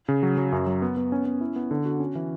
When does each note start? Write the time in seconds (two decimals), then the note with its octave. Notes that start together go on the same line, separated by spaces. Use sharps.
0.09 C#3
0.23 F#3
0.38 F#3
0.52 F#2
0.67 F#3
0.82 B3
0.97 B3
1.12 C#4
1.26 C#4
1.41 E4
1.56 B3
1.71 D3
1.85 F#4
2.00 C#4
2.15 E3